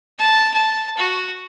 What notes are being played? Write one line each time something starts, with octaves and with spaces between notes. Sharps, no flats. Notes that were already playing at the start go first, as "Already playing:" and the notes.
A5
A5
F#4